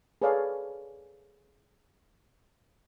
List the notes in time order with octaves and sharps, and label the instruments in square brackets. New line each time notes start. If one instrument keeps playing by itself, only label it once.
[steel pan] G#4 A4 B4 C#5 D5 F5